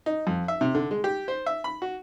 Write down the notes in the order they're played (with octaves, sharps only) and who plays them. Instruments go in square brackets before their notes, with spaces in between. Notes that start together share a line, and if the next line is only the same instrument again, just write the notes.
[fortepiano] D#4
F2
E5
C3
D3
G#3
G4
C5
E5
B5
F#4